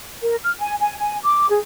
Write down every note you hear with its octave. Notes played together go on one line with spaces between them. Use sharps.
A#4
F6
G#5
G#5
G#5
D6
G#4